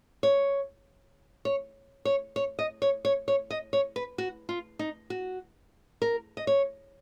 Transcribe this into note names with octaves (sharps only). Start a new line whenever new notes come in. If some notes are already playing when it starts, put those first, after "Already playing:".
C#5
C#5
C#5
C#5
D#5
C#5
C#5
C#5
D#5
C#5
B4
F#4
F4
D#4
F#4
A#4
D#5
C#5